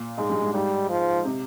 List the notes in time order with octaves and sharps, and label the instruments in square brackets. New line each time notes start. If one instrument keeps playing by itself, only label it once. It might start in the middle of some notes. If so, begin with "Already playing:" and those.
Already playing: [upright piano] A#2
[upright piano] G#2 [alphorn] G#3
[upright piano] G2
G#2
[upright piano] G#2 [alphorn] G3
[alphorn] F3
[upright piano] C3